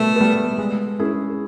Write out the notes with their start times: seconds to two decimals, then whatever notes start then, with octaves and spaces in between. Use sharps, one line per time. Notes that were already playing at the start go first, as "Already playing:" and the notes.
Already playing: B2 G3 A3 B3
0.16 G3 B3
0.58 G#3
0.99 C#4 E4 G#4